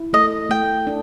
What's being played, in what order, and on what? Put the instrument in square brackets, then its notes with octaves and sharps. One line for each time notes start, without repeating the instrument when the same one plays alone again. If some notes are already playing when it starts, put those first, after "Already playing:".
Already playing: [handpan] E4
[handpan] A3 [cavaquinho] D#5
[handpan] A3 [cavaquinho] G5
[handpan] D4